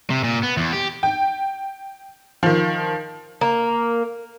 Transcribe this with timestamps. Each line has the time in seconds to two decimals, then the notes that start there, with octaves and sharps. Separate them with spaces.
0.10 C3
0.24 A#2
0.43 B3
0.57 E2
0.73 G4
1.03 G5
2.43 D#3 F3
3.41 A#3